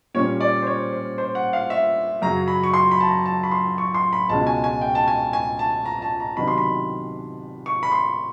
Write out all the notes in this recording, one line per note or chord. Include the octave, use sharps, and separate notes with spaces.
A#2 G3 A#3 C#4 C#5
D5
C5
C#5
C5
C5
F#5
F5
E5
F#2 C#3 F#3 A#5
B5
C#6
C6
B5
A5
A#5
A5
B5
C6
C#6
C6
B5
C#2 B2 G#3 C#4 A5
G#5
G#5
G5
A5
G#5
G#5
A5
A#5
A5
A#5
C3 D#3 F#3 B3 D4 B5
C6
B5
C#6
B5
C6